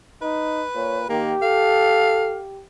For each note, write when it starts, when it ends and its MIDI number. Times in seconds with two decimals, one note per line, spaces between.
0.22 0.65 63
0.22 1.07 71
0.75 1.05 46
0.75 0.99 73
1.10 1.35 51
1.10 1.34 58
1.10 2.64 67
1.42 2.39 69
1.42 2.48 77